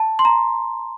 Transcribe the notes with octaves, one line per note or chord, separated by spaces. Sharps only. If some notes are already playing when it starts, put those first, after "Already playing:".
Already playing: A5
C6
A#5